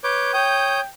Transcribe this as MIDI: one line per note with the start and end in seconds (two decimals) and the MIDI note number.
0.04 0.33 71
0.04 0.33 73
0.04 0.33 86
0.04 0.33 91
0.33 0.80 73
0.33 0.87 79
0.33 0.80 87
0.33 0.80 91